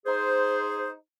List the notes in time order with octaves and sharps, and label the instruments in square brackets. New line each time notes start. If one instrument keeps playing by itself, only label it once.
[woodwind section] D#4 G#4 C5